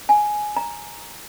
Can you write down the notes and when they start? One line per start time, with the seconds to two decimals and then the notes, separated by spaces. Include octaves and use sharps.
0.09 G#5
0.57 A#5